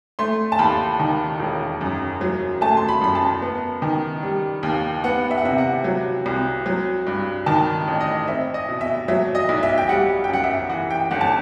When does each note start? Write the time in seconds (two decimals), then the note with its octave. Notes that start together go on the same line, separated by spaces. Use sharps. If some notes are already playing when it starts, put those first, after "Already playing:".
0.19 A3 C6
0.52 A5
0.59 D#2 B5
1.00 D#3
1.39 E1
1.81 F#2
2.21 F#3
2.61 A3 A5
2.77 C6
2.88 B5
3.01 F#2 B5
3.15 A5
3.42 B3
3.82 D#3
4.23 G3
4.63 D#2
5.04 B3 F#5
5.31 E5
5.38 F#5
5.45 C3 E5
5.58 F#5
5.84 F#3
6.26 C2
6.66 F#3
7.07 G2
7.46 D#3 A5
7.88 A1
8.00 D#5
8.27 C4 E5
8.54 D#5
8.68 B2
8.81 E5
9.08 F#3 E5
9.35 D#5
9.49 B1
9.63 E5
9.78 G5
9.89 G3 F#5
10.24 G5
10.29 F#2 F#5
10.44 E5
10.69 E3 F#5
10.91 G5
11.11 G1 F#5
11.21 A5